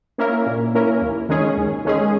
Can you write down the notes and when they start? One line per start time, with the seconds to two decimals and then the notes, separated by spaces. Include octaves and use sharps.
0.18 A#3 C#4 E4 A#4
0.46 A#2
0.75 A#3 C#4 E4 A#4
1.02 D#2
1.29 D#3 G#3 C#4 G#4
1.57 D#2
1.85 D#3 G#3 C#4 G#4